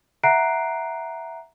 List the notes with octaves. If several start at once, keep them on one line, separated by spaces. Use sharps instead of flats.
E5 F#5 A#5 F#6 C7 D7